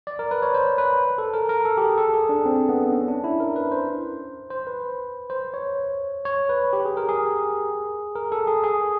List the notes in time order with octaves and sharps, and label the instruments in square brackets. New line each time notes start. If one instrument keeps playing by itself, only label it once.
[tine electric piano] D5
A#4
B4
C#5
C5
B4
A4
A#4
A#4
A4
G4
G#4
A4
G#4
D4
C4
B3
C#4
D4
E4
A#4
B4
C5
C5
B4
C5
C#5
C#5
B4
G4
G#4
A#4
G#4
A#4
A4
G#4
G#4